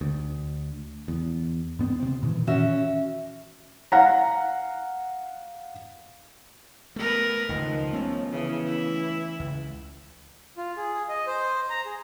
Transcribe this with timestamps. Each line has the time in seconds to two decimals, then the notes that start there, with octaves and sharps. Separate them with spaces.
0.01 D2
1.08 E2
1.79 G2 B3 C4
2.00 C3 C4
2.23 A#2 D#3 E3
2.47 C#4 F#4 E5
3.92 F5 F#5 A#5
6.96 A3 B3 A#4 B4
7.49 D#1 C#2 D#3 F3
7.93 A3 B3 C#4
8.32 C#3 E3
8.66 E4
9.40 C#2
10.57 F4
10.77 G#4
11.09 D#5
11.27 C5
11.70 A#5
11.86 G#4